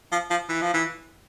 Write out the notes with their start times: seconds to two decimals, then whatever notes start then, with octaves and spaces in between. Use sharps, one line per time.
0.12 F3
0.30 F3
0.49 E3
0.61 F3
0.74 E3